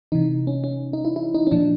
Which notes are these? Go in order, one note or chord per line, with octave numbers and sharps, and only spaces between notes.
C3 E3 D#4
C#4
C#4
D#4
E4
E4
D#4
C#4
A#2 F3 D4